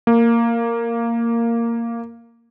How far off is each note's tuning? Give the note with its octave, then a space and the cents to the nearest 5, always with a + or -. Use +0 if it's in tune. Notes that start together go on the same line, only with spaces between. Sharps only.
A#3 -10